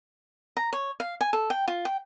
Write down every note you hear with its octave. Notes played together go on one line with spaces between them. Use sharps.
A#5
C#5
F5
G#5
A4
G5
F4
G5